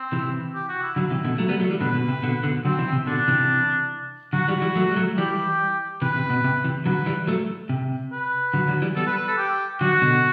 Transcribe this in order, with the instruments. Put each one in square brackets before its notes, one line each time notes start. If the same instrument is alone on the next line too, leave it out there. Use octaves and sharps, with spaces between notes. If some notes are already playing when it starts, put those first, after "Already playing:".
Already playing: [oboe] C4
[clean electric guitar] C3 E3
[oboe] G4
F#4
E4
[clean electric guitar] D3 F#3 [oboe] E4
[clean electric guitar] C3 E3
B2 D3
F#3 A3
G3 B3
F#3 A3
E3 G3
[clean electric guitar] B2 D3 [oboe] B4
[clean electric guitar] B2
C3
B2 D3
B2 D3
[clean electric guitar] D3 F#3 [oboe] C4
[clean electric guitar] C3 E3
C3
[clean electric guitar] B2 D3 [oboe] D4
[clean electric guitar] C3 E3
[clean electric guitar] D3 F#3 [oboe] F#4
[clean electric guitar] E3 G3
E3 G3
F#3 A3
G3
F#3 A3
[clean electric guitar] E3 G3 [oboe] G4
[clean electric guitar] C3 E3 [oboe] B4
[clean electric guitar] C3
B2
C3
C3 E3
[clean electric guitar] D3 F#3 [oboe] B4
[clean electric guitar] E3 G3
F#3 A3
C3
[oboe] B4
[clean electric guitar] D3 F#3
D3 F#3
E3 G3
[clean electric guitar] G3 B3 [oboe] A4
[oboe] B4
B4
A4
G4
[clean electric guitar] D3 F#3 [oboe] F#4
[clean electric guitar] B2 D3